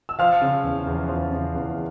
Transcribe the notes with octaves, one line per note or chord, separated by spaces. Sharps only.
E6
F3 F5 F6
C#3
E2
E2
F3
C#3
E2